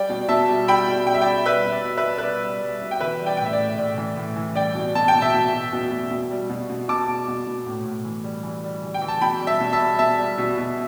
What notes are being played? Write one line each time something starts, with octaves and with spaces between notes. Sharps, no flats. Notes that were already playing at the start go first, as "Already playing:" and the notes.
Already playing: G3 D5 G5
B2
B2 E5 A5
G3
G3 G5 B5
B2
G3 G5
E5
D5 G5
G3
G3 B4 E5
B2
D5
B2
B4 E5
B2
B4
G3 D5
G3
G3
B2
G5
E3 B4 E5
G3
D5 G5
A2 G5
E5
D5
A2
A2 D5
E3
A2
E3
G3 D5 G5
B2
B2 A5
G5
B2
E5 A5
B2
B2
B2
B2
B2
G3
B2
B2
B2 A5 D6
B2
B2
B2
A2
A2
E3
G3
E3
G3
E3
G5
E3
A5
B2 G5 B5
G3
E5 A5
B2
E5 A5
G3
B2 E5 A5
G3
B2
B2